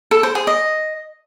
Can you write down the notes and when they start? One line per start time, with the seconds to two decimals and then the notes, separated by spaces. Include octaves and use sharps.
0.11 A4
0.23 C5
0.35 G#4
0.47 D#5